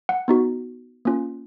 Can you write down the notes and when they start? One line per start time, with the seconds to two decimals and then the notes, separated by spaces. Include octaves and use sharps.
0.09 F#5
0.28 B3 D#4 F#4
1.05 A#3 C#4 F4